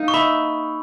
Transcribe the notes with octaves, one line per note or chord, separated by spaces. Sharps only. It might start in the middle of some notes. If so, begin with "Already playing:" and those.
Already playing: A#3 D#4
C#6
E5 B5